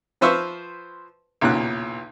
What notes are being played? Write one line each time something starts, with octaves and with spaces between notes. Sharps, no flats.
F3 B4 C5 E5 F5 C#6
B1 E2 A#2 C#3 F#6